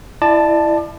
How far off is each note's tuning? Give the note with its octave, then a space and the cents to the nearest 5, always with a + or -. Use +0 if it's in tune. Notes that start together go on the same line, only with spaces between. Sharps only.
E4 +10 D5 +30 A5 +0